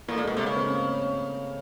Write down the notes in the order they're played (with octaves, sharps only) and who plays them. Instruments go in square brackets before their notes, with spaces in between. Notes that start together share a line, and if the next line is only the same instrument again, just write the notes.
[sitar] A2 [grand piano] A#3
[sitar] A#2 [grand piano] A3
[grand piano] G#3
[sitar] B2
[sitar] C3 [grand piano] A3
[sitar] C#3 [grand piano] A#3
[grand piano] C4
C#4